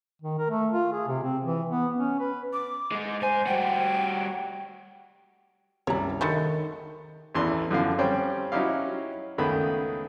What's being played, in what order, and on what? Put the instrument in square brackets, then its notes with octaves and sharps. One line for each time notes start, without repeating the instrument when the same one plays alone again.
[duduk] D#3
A#4
A3
F4
G#4
C3
C4
E3
B3
C#4
B4
[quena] D6
[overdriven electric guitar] G#3 D#4
[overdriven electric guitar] G#2 G#5 [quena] C5
[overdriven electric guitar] G3 F#4 [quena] G5
[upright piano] C2 [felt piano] F#2 G3 D5 [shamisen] C#5 A#5
[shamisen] D3 G#3 A3 [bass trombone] D#3 [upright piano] B5 A6 C#7 [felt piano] G6
[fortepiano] A1 E2 E3 C6
F#2 D3 F3 F5
G3 C4 C#4 C5 G5
F#3 C#4 D#4 E4 G4 F5
C#2 D#3 A3 B3 G#4 B5